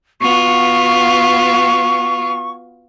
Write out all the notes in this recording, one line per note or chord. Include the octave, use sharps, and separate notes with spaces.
B3 F4 F#4 C#6